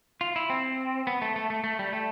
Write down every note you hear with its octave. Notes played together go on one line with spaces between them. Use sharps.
F4
E4
C4
B3
A3
A3
A3
A3
G3
A3